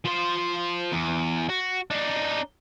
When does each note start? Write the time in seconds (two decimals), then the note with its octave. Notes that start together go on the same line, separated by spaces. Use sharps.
0.05 F3 C5
0.92 E2
1.50 F#4
1.90 D4 D#4